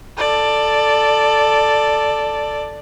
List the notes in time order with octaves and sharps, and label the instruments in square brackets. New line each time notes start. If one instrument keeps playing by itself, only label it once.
[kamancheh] A4 D5